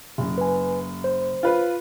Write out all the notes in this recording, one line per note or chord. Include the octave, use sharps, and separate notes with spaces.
F#1
B4 G#5
C5
F4 B4